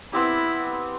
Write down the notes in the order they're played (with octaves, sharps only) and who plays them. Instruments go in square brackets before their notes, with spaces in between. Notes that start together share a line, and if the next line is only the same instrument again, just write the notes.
[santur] B3 C4 G4 [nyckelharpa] E4